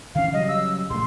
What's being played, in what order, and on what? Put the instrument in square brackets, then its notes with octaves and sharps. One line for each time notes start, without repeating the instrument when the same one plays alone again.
[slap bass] D#3 E3 C#4 [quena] F5
[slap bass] C#3 F#3 G3 [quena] D#5
[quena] E6
[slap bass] A#1 A3 [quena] C6